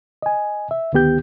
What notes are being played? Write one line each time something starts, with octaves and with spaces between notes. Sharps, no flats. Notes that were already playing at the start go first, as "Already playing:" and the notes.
D#5 G#5
E5
D2 D#3 B3 G4 G6